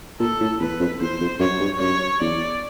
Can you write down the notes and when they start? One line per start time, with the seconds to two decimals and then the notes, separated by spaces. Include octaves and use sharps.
0.19 A#2 A4
0.40 A2
0.60 E2 B4
0.80 F2
1.00 E2 C5
1.21 F2
1.39 F#2 C#5
1.60 G2
1.80 F#2 C#5
2.20 E2 D5